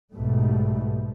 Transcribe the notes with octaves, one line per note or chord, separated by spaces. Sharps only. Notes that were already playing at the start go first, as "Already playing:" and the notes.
B1 G#2 B2 G3 A3